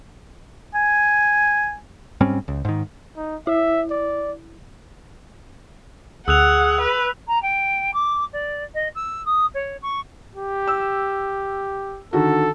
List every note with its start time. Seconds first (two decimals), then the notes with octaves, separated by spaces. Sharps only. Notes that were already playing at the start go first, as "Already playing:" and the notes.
0.75 G#5
2.20 G#2 G3 C4 C#4
2.48 C#2
2.65 G#2 D#3
3.17 D#4
3.47 E4 E5
3.90 D5
6.28 D2 G#4 F#5 E6 F#6 F7
6.81 B4
7.27 A#5
7.42 G5
7.93 D6
8.32 D5
8.74 D#5
8.95 E6
9.25 D#6
9.54 C#5
9.82 C#6
10.35 G4
10.67 E6
12.13 D3 D#3 F#4 A4